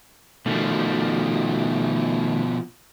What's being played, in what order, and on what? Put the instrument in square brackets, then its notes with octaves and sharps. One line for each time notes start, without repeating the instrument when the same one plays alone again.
[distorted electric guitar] B2 F3 [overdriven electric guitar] D#3 A3